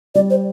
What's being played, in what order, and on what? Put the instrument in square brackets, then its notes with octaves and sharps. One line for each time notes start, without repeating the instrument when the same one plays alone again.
[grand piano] G3 [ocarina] D5
[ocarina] C5